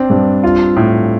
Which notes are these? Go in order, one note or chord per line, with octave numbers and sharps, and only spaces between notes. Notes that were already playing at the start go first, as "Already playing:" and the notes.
Already playing: C4 D4
G2
F4
A2